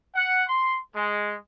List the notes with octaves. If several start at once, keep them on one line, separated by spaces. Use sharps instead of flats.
F#5
C6
G#3